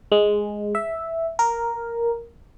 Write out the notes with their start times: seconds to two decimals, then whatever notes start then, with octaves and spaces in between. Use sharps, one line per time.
0.12 G#3
0.75 E5
1.39 A#4